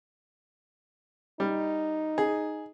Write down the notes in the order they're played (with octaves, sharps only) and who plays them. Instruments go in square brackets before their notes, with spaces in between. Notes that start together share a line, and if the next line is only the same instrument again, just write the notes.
[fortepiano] G3 [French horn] D#4
[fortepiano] G#4